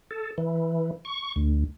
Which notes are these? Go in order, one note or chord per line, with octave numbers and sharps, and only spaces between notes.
A4
E3
C#6
D2